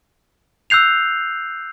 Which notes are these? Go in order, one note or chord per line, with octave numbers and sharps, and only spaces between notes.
E6 F#6 G6 C7 F7